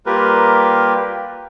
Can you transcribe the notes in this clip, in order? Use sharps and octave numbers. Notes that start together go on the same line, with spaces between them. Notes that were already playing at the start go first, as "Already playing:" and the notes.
G3 A#3 F4 G4 A#4 B4